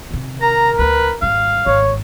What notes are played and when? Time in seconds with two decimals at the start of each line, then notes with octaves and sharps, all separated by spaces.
0.11 C3 D#3
0.42 A#4 A#5
0.79 D2 C#3 B4
1.22 G#1 G3 F5
1.66 G#1 C#5